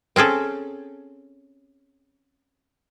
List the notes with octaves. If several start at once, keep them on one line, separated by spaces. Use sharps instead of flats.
C4 C#4 G#4 A4